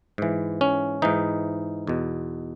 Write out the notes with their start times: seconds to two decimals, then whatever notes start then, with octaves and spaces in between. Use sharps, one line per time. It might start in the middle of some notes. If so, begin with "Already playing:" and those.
0.18 G#2 E3
0.61 C#4
1.02 G#2 E3 D#4
1.87 E2 B2